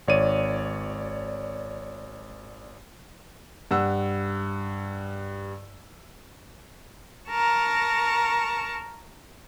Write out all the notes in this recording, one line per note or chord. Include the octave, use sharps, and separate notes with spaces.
G#1 C#5 D5 D#7
G2 F#5 E6
A#4 A5 A#5 C#6